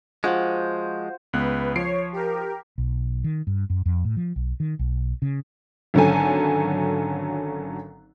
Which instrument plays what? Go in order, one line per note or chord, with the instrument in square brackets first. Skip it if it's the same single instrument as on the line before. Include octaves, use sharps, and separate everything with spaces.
[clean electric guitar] F3 G#3 [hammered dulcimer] F4 F#4 C5
[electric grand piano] C#2 B3 F#6 [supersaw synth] B4
[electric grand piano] F3 C7 D7 [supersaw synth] C#5
[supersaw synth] G4 A#4
[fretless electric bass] B1
D#3
G2
F#2
F2
A2
F3
B1
D#3
B1
C#3
[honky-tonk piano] G#1 D3 F#3 C#4 A4 G#5